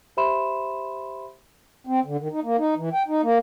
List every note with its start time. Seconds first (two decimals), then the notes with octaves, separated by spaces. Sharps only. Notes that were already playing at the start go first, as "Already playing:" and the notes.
0.17 G4 C5 E5 B5 C6 E7
1.87 C4
2.05 D3
2.20 D#3
2.32 D#4
2.44 A#3
2.58 D#4
2.76 E3
2.93 G5
3.08 D#4
3.23 A#3